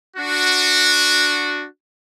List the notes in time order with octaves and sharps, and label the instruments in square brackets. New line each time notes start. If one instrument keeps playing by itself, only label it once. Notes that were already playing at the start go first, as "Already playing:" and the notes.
[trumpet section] D4 F#4